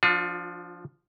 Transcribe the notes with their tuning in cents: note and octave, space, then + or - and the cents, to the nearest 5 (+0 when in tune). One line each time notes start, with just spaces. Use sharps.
F3 +0 D4 +0 F4 +40